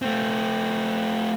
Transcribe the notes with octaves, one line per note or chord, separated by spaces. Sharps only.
A3 C4